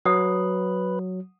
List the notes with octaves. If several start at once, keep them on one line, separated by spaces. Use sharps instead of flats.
F#3 B4 F#5 D#6